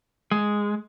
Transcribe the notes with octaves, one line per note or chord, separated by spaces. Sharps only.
G#3